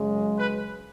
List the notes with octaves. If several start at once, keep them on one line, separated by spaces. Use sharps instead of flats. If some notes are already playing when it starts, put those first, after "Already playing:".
Already playing: F#2 C#3 G#3
B4